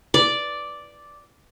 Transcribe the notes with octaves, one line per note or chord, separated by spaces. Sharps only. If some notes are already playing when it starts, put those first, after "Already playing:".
D5